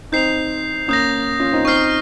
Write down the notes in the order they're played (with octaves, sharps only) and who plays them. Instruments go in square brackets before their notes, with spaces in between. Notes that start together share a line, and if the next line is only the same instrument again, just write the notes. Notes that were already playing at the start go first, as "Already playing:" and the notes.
[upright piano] C4 D#4 [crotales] G6 C7 F7
[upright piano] A#3 C#4 [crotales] D#6 G6 A#6
[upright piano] C#4 F4
C4 D#4
[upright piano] C4 D#4 [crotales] C#6 F6 C7